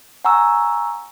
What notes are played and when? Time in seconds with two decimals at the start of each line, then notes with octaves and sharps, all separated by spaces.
0.25 F#5 G#5 A#5 C#6 E6